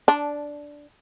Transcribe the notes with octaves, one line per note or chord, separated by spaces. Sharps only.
D4